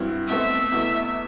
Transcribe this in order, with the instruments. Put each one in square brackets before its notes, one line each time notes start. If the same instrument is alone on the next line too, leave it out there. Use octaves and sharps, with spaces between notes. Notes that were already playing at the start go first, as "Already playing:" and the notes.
Already playing: [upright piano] G2 F#3 C4 E4
[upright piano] B2 A3 C4 [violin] E5
[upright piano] E2 B2 A3